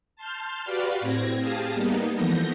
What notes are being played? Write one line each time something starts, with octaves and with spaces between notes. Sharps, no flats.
A5 C6 F6 G6
F#4 G4 B4 D5 F5 B5
A2 C4 G#6 A#6
G4 G#4 F5 A5 D#6
G3 A#3 B3 D#4
E3 F3 A3 B3 G6 A#6